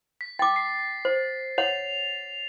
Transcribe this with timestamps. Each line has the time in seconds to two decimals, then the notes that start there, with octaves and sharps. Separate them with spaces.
0.21 B6
0.39 G5 D6 A6
0.56 C7
1.05 C5
1.58 C#5 F#5 F7